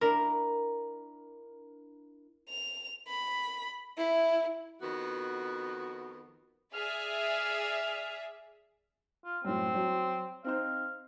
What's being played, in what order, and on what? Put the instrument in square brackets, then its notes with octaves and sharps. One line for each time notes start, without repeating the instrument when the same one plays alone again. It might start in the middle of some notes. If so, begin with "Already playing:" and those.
[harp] D4 E4 A#4
[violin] F7
B5
E4
[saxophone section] F2 D#3 B3 F#4
[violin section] G#4 D5 E5 [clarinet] F6
[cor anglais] F4
[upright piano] F#2 A2 [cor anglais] C4
[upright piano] F#3
[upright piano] C4 D#4 C5 [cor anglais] F5